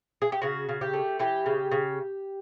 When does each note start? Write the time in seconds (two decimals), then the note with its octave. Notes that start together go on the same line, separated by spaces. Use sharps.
0.22 G#4
0.32 G4
0.42 C#3 F#4
0.69 C#3
0.81 G4
0.93 A3
1.19 E3 G4
1.46 C#3
1.72 C#3